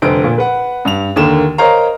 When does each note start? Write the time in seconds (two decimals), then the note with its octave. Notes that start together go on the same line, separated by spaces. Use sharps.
0.02 F1 D3 C5 D7
0.24 A#2
0.38 B4 F#5
0.85 G2 F7
1.16 D#2 D3 A#3 E7
1.58 A#4 C5 C#5 D#5 F5 A#5